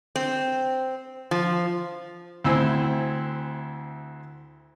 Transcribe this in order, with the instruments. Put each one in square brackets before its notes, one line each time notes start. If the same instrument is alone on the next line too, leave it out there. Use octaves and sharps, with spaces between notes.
[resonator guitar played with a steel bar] C4
F3
[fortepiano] D2 C4 E4 C5 G#5 E6